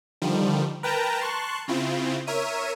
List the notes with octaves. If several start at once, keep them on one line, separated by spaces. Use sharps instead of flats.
D3 D#3 F3 G3
A#4 B4 G5 A5 A#5
A5 C6 C#6 F#6
C#3 C4 E4 F4
A#4 C#5 E5 D#7